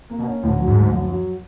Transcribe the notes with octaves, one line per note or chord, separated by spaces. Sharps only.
A#3
B2
C#4
D2 A2
F#3
G#2
D2
F#2
F#3